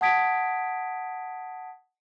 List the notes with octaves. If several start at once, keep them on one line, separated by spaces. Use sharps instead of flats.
F#5 A5 D#6 G#6 B6 D7